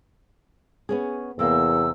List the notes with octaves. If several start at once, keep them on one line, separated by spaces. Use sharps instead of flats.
B3 C#4 G#4
E2 C3 A#3 E6